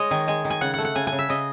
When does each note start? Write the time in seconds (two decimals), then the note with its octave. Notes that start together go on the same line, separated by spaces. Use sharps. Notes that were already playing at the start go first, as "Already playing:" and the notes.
Already playing: G#3 C#5 D#5
0.11 D#3 G#5
0.28 G#3 G#5
0.45 D#3
0.50 G#5
0.61 C#3 F#5
0.74 A3 F#5
0.85 F#5
0.95 C#3 G#5
1.07 G#5
1.12 C#3
1.19 E5
1.29 C#3 D#5